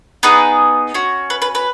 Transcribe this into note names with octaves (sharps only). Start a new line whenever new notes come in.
B3 D#4 G#4 B4
C#4 F#4
B4
B4
B4